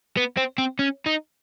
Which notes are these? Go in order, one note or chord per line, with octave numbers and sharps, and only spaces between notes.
B3
C4
C4
C#4
D#4